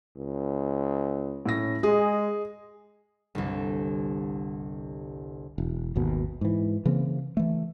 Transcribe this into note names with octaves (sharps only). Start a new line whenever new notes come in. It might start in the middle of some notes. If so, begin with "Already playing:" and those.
C#2
A2 C#4 A#6
G#3 G#4
G1 C2
E1
G#1 D#2 B2
G#2 E3
C#3 E3 A#3 C4
E3 A3